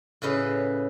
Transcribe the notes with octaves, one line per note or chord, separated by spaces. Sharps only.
A2 C#3 B4 D#5